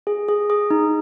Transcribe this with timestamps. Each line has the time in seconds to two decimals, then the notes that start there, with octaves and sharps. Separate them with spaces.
0.07 G#4
0.28 G#4
0.50 G#4
0.70 D#4